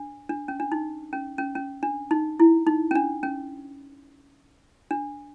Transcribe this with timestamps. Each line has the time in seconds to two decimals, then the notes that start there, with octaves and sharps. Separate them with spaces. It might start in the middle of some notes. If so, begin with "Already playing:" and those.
Already playing: D4
0.29 D4
0.48 C#4
0.60 D4
0.72 D#4
1.13 C#4
1.38 C#4
1.55 C#4
1.83 D4
2.11 D#4
2.40 E4
2.67 D#4
2.91 C#4
2.95 D4
3.23 C#4
4.91 D4